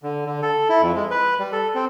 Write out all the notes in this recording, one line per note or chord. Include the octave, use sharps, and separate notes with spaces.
D3
D3
A4
E4
F2
G#3
B4
G3
A4
C4